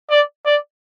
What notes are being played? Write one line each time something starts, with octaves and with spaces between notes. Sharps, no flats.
D5
D5